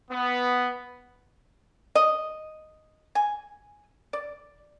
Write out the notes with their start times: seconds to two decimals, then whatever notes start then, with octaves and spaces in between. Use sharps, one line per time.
0.10 B3
1.95 D#5
3.15 G#5
4.13 D5